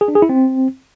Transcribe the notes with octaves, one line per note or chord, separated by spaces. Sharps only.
G#4
D4
G#4
E4
C4